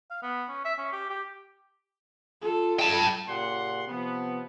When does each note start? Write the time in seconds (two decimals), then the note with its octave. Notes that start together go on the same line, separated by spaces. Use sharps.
0.11 F5
0.22 B3
0.49 C#4
0.65 E5
0.78 C#4
0.92 G4
1.10 G4
2.42 F4 A4
2.79 G5 A5
3.28 A#2 C#3 G4 F#5 C6
3.87 C3 F3 B3